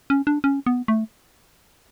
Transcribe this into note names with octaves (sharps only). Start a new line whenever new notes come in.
C#4
D4
C#4
B3
A3